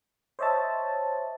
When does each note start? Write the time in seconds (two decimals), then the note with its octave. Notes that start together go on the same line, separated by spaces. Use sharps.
0.39 C5 C#5 D#5 E5 A5